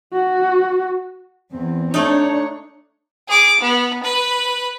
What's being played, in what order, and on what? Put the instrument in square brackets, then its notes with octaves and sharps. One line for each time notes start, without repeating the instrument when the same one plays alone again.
[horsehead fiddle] F#4
[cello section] E2 [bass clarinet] C4
[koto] A3 D#4 [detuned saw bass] D4 [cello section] C#5
[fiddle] G#4 D6
B3
B4